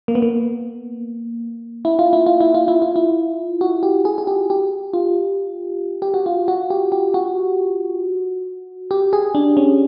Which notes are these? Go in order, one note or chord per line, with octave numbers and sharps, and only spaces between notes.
A#3
B3
A#3
E4
F4
E4
F4
E4
F4
E4
F4
E4
F#4
G4
G#4
G#4
G4
G4
F4
G4
F#4
F4
F#4
G4
G4
F#4
G4
G#4
D4
C#4